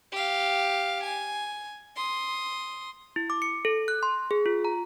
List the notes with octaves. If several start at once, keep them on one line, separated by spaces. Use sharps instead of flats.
G4 F5
G#5
C6 D#6
E4
D6
C#7
A4
F#6
C6
G#4
F4
A#5